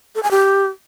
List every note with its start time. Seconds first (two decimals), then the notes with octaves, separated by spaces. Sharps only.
0.15 A4
0.23 G#5
0.31 G4